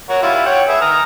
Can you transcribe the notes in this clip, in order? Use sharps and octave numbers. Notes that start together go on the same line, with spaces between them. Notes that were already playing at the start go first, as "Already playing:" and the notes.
F#4 A#4 C#5
G3 E4 F4
C#5 F#5 G5
G#4 B4 E5
A#5 D#6 F6